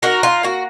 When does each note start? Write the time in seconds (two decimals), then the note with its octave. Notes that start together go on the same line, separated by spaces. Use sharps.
0.02 D#4 F#4 A#4
0.23 F4
0.43 A#3 F#4